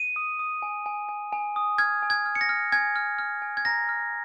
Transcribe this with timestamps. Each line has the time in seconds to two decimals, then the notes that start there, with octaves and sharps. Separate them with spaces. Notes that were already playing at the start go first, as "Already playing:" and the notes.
Already playing: D#7
0.16 D#6
0.39 D#6
0.62 G#5
0.86 G#5
1.09 G#5
1.32 G#5
1.56 D#6
1.78 F6 G#6
2.03 G#5
2.10 G#6
2.26 F6
2.35 C#7
2.41 A#6
2.49 F6
2.72 G#5 G#6
2.96 F6
3.19 F6
3.42 G#5
3.57 G#6
3.65 A#5 A#6
3.89 F6